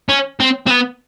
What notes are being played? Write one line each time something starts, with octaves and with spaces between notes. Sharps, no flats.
C#4
C4
C4
B3